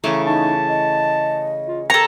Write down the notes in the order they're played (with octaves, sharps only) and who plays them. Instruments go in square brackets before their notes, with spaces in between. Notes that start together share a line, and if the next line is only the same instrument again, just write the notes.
[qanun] C#3 E3 A3 [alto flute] A#5
[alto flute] D#4 [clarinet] A5
[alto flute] D#5
[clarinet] F4
[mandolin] A4 A#5 [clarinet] A#4 [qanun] C#5